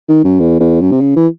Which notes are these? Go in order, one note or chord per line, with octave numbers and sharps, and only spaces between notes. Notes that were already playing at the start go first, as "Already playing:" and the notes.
D#3
F#2
E2
E2
F#2
C3
C#3
E3